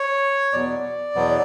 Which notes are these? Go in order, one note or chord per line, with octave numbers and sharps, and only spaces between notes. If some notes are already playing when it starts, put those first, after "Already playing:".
Already playing: C#5
E2 B2 F#3 B3 D5
E2 B2 F#3 B3